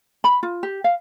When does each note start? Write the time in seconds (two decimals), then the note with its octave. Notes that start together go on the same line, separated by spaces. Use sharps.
0.24 B5
0.43 F4
0.63 G4
0.84 F5